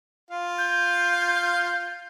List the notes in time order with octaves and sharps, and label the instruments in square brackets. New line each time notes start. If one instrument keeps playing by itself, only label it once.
[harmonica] F4 F5
[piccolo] G6